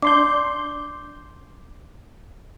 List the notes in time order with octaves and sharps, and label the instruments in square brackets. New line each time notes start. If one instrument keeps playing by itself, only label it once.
[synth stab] D4 C6 G6 [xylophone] D6